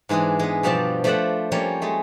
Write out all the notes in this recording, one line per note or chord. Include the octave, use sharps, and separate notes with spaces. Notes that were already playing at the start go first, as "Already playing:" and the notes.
G#2 E3 G#3 D4 G#4
G#3 B3
G2 B2 F3 G3 D5 A5
F3 A3 C5 D5 E5 F#5
F3 G3 A#3 C#4 C#5
G#3 A3